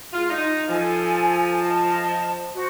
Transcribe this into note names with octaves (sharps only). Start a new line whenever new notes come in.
G#3 F4
D#4
F3 A4 G#5
D#5 A5
F#4 C5